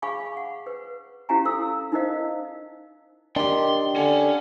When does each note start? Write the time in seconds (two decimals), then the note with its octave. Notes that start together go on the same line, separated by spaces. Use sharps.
0.02 G#4 F5 G#5 B5 C#6 D6
0.37 F#5
0.66 B4
1.29 C#4 E4 G4 F5 G#5 A#5
1.45 A4 E6
1.92 D#4 E4 A#4 C5 D#5 F5
3.36 D#3 D4 G4 C6
3.96 D3 C#4